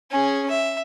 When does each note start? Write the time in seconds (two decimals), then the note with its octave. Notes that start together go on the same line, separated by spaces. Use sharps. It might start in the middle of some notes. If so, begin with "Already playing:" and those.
0.11 C#4 G#4
0.50 E5